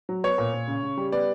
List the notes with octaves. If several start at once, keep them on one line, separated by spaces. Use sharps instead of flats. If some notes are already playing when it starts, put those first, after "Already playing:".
F#3
B3 C#5
A#2
A#2
C#3
C#3
G3
B3 D5